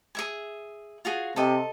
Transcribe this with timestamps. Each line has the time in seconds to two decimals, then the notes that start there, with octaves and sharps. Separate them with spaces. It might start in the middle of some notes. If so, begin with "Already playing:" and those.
0.15 G#4 E5 G#5
1.05 F4 F#4 G#4
1.36 C3 A4 D#5